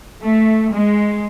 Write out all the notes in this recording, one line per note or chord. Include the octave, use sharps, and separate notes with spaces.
A3
G#3